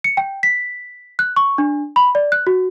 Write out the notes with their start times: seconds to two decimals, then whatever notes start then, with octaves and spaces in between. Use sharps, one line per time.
0.04 C#7
0.17 G5
0.43 B6
1.19 F#6
1.36 C#6
1.58 D4
1.96 B5
2.15 D5
2.32 F#6
2.47 F#4